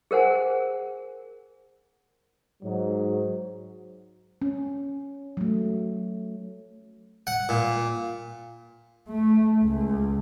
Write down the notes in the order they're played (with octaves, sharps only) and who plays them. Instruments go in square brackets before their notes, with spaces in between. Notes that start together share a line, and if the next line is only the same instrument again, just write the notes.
[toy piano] G#4 A#4 C5 F#5 G#5
[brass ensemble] G#2 F#3
[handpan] C#4
F#3 A3
[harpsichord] F#5
A#2
[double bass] A3
C#2